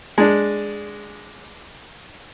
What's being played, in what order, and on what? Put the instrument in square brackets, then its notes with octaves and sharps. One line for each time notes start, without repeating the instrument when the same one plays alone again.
[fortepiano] G#3 D4